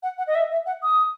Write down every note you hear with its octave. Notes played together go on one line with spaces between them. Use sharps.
F#5
F#5
D#5
E5
E5
F#5
D#6